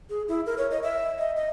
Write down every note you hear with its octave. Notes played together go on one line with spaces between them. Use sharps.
G#4
E4
A#4
C#5
D#5
E5
D#5
D#5